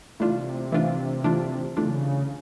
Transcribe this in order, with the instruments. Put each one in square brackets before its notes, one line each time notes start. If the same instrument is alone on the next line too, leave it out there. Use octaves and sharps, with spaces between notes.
[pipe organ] C3 [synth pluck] E3 A3 D4 F4
[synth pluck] E3 A3 D4 F4
E3 A3 D4 F4
[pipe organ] C#3 [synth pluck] E3 A3 D4 F4